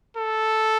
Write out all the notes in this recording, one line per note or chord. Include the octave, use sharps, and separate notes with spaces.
A4